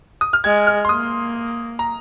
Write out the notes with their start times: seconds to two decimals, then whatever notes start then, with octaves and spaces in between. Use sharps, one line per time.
0.21 D#6
0.33 F6
0.44 G#3 G#6
0.67 F6
0.85 C6
0.89 A#3 D#6
1.79 A#5